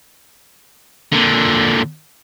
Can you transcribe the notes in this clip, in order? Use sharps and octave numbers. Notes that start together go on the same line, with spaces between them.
A#2 D3